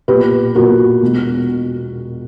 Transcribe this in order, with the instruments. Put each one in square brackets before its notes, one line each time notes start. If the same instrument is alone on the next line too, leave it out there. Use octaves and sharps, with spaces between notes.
[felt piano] B1 A#2 G4 B4
B1 A#2 F#4 A#4
E1 E2 B2